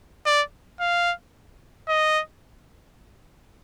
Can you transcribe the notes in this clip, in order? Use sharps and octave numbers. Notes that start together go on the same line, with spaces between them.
D5
F5
D#5